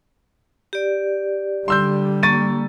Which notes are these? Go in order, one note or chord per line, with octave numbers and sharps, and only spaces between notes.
G4 D5
D3 G3 C6 E6 G6
A#3 C#6 A6 D#7